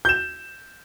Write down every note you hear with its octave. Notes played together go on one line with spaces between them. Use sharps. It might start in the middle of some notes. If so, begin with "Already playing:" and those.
G6 E7